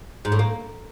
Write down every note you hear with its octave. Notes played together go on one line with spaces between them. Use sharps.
G#2
A2
A#3